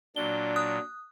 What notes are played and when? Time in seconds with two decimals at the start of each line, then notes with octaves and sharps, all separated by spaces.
0.16 A#2 F#3 D4 G7
0.56 D#6 F#6